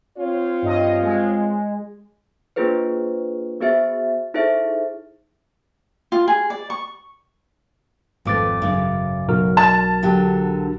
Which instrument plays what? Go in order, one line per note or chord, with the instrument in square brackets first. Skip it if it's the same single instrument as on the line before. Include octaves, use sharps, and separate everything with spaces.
[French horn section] C4 F4 C#5
[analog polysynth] G2 D#5
G#3
[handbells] A#3 D4 F4 G#4 B4 C5
B3 F#4 G#4 C5 E5 A6
D#4 E4 G#4 A4 C5 E5
[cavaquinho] F4
G#4
D5
C#6
[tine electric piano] G#1 D6 A6 [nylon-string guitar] F2 A3 B4
[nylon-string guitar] F#2 C#3
[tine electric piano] B1 F#4 A#4
[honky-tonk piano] A5
[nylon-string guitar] D3 F#3 G4